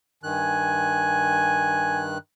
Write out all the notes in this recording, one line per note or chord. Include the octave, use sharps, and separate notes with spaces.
G2 D#3 G#5 F#6